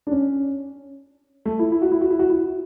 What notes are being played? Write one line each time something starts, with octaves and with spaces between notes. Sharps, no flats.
D4
C#4
A3
E4
E4
F#4
E4
F#4
E4
F#4
E4